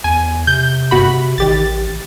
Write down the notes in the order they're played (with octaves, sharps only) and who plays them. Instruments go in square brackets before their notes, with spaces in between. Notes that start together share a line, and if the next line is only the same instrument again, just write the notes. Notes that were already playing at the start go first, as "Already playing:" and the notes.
[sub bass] E2 [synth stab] G#5
[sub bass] C3 [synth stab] G6
[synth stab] G1 F#4 B5
[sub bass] A1 [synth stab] D#3 G4 A6